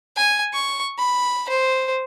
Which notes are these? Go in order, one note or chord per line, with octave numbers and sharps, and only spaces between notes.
G#5
C#6
B5
C5